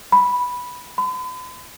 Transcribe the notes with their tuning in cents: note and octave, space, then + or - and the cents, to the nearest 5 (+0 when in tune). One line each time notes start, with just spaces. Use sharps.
B5 -5
B5 +45